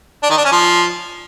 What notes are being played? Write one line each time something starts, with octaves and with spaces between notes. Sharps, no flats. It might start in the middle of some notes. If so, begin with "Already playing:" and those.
D4
D#3
D4
C#4
F3